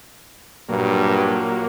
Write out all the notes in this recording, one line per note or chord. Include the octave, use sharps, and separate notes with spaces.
G2 A#2 F#3 A#3